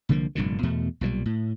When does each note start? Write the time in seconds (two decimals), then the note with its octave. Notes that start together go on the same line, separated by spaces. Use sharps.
0.09 C2 D3 F3 A#3
0.35 F1 G2 A#2 D3
0.63 E2 B2 A3
1.01 B1 A#2 E3 G3
1.26 A2